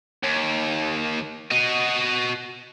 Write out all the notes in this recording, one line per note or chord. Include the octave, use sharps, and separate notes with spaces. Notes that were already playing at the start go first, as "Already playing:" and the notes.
D#2
F#4 D#5